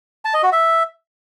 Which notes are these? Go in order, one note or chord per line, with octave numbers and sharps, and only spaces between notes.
A5
D#5
F#4
E5